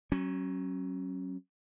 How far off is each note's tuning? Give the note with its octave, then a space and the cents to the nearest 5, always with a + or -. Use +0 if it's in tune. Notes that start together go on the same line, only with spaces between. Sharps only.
F#3 +25 C#4 -20